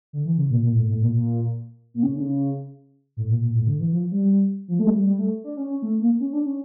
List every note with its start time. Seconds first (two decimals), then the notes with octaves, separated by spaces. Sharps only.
0.13 D3
0.26 E3
0.38 C#3
0.51 A#2
0.63 A#2
0.75 A2
0.89 A2
1.02 A#2
1.14 A#2
1.94 A#2
2.03 C#3
2.16 D3
2.21 C#3
3.17 A2
3.29 A#2
3.42 A#2
3.55 A2
3.66 D3
3.80 E3
3.93 F3
4.12 G3
4.68 F3
4.79 A3
4.87 G3
5.06 G3
5.19 A3
5.44 D4
5.57 C#4
5.70 C#4
5.82 A3
6.01 A#3
6.20 C#4
6.33 D4
6.46 C#4